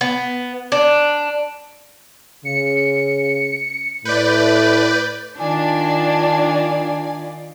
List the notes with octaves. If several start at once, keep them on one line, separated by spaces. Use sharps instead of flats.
B3
D4
C#3 C#7
A2 B4 D5 G6
D#3 D4 F4 D5 G#5